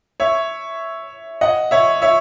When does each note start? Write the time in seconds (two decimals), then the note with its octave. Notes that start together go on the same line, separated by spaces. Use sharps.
0.20 C#5 E5
1.41 D#5 F#5
1.71 C#5 E5
2.02 C#5 E5